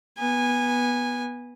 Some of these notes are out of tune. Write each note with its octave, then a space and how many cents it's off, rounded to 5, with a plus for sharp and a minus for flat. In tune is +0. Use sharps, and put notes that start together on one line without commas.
B3 -15 G#5 -15